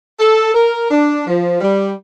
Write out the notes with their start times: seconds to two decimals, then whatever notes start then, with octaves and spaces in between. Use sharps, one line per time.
0.20 A4
0.54 A#4
0.90 D4
1.26 F3
1.61 G3